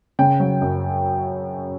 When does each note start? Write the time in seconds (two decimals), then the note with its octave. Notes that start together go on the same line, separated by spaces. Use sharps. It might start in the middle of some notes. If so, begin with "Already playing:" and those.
0.19 C#3 G5
0.40 F#3
0.61 F#2